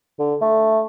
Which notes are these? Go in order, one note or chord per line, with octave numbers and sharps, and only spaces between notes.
D3
A3